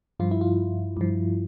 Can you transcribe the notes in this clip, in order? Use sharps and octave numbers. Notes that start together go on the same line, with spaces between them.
G2 F3 F4
E4
F4
G2 F3